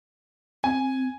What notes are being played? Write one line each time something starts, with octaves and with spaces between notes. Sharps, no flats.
C4 G#5